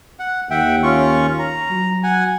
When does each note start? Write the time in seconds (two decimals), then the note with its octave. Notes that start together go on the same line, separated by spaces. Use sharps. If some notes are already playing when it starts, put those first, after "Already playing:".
0.19 F#5
0.51 D#2 E5 F#5 G5
0.83 C#4 F4 C#6
1.39 A#5
1.71 F#3
2.03 F#5 G#5